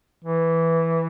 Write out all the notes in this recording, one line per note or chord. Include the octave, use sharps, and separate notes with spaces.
E3